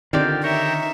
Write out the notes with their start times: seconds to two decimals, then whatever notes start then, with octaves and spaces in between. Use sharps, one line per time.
0.13 D3 D#3 C4 F4 G4 D5
0.44 D#4 A#4 C#5 E5 G5